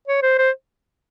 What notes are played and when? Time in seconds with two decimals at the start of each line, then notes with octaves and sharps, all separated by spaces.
0.08 C#5
0.22 C5
0.38 C5